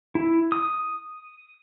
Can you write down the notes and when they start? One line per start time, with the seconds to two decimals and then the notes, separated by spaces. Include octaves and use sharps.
0.15 E4
0.52 D#6